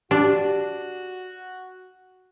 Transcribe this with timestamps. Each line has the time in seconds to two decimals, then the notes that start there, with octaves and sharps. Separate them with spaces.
0.11 D4 F#4 G4